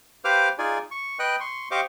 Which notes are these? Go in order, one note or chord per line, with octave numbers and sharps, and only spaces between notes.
G4 B4 C5 F5 D6 F6
D#4 F4 G#4 D5 G#5
C#6
B4 D#5 G5 F#6
C6 C#6
G4 C5 D#5 F5 C#6 D6